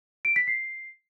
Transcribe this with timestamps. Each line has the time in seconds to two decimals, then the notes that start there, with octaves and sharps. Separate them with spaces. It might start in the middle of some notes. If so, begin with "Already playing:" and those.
0.25 D7
0.36 B6
0.47 C7